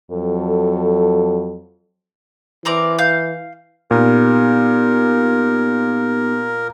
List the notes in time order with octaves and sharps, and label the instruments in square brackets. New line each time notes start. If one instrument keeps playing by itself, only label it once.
[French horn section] F2 F#3 A4
[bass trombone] E3 [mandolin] C4 A#4 D5
[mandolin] F5 G6
[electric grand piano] A#2 [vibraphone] B3 D#4 G4 [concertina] A#4